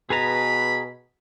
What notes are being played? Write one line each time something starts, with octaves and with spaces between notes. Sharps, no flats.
B2 G#4 B4 A#5 B5